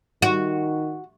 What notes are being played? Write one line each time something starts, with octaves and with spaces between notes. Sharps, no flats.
D#3 F#4